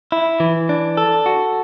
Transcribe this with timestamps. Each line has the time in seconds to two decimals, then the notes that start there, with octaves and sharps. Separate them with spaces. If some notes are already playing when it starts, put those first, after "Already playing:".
0.12 E4
0.40 E3
0.69 D4
0.97 A4
1.26 F#4